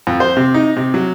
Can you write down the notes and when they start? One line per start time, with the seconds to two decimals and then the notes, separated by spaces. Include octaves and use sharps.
0.07 F2
0.20 C5
0.37 C3
0.54 D#4
0.76 C3
0.94 F#3